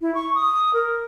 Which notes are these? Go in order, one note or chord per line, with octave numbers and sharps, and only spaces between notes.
E4
C#6
D#6
A#4